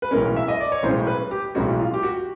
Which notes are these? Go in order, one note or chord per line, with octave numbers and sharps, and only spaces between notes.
B4
B1 A2 E3 G#3 C#4 A#4
E5
D#5
D5
C#5
B1 A2 E3 G#3 C#4 C5
B4
G4
B1 A2 E3 G#3 C#4 F#4
F4
G4
F#4